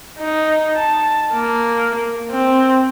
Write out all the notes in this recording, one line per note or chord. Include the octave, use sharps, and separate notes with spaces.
D#4
A5
A#3
C4